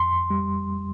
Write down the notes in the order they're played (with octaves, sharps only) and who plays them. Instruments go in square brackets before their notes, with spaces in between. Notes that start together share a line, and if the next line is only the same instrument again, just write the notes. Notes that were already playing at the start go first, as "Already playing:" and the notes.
Already playing: [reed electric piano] F2 C6
G3